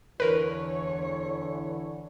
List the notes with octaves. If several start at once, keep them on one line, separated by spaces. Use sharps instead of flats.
E2 D3 E3 A#4 B4 C#5